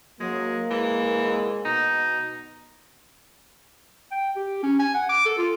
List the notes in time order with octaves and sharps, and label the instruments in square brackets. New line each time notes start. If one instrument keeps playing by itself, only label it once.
[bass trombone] F#3 [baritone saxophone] G#3 [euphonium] A#3
[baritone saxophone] E3 [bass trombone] G#3
[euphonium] B2 [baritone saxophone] D#4
[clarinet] G5
G4
C#4
G#5
F#5
D6
A4
F4